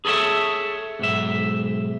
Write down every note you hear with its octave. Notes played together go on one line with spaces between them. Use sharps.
G#4 A4 B4 C#5 E5
B1 G#2 E5